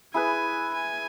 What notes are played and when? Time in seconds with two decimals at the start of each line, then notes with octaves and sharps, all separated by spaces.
0.14 E4 G#4 B4 G#5
0.74 G#5